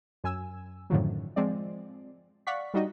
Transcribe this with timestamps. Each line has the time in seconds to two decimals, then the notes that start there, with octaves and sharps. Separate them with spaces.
0.24 F#2 G#5 E6
0.90 F#2 A2 D3 D#3 F3 F#3
1.36 F3 G#3 C4 D5
2.47 D5 F5 F#5 C#6 B6
2.74 G3 D4 D#4 F#4 D#5